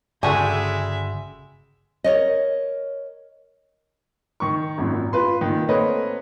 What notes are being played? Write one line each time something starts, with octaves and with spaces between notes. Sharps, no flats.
G1 C#3 G3 G#3 F#4 A4 E5 G#5
A#4 C#5 D#5
D#3 C#6
G#1 F#2 A#2
F4 B4 C6
A#2 D#3
A3 A#3 C4 B4 C#5 D#5